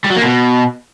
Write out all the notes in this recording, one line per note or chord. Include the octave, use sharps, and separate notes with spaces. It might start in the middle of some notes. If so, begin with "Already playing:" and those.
G3
F#3
A#3
B2